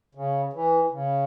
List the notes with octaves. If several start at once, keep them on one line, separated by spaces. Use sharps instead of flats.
C#3
E3
C#3